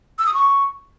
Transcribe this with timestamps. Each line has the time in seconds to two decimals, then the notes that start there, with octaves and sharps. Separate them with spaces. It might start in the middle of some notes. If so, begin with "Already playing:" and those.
0.18 E6
0.26 D#6
0.34 C#6